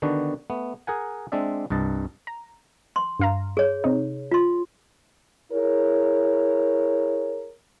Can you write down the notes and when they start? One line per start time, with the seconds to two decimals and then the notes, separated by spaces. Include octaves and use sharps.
0.02 D3 D#3 B3 D4 F#4
0.50 A3 B3
0.87 G#4 A#4 F#5 G#5
1.32 G#3 C4 D4 D5 E5
1.70 C2 G2 D#5 A5
2.27 A#5
2.96 C6
3.19 G2 F5 A#5
3.57 G#4 C#5
3.84 C3 D#4
4.31 F4 C6
5.53 E4 G#4 A#4 C#5